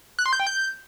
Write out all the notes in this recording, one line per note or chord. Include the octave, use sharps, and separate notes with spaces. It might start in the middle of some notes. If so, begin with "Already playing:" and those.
F#6
C6
G6
G5
G6